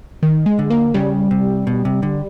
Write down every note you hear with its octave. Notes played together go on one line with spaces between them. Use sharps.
D#3
G#3
D3
A#3
C#3 G3
C3
B2
C3
D3